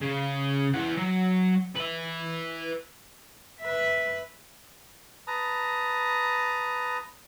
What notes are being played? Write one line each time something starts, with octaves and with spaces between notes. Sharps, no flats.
C#3
E3 F#5
F#3
B4 E5
B4 E5
B4 A5 A#5 D#6